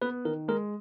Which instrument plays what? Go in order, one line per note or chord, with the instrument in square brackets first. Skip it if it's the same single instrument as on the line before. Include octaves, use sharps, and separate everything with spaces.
[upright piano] B3 [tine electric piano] B4
[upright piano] D#3 [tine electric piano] A#4
[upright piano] G#3 [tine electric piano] A#4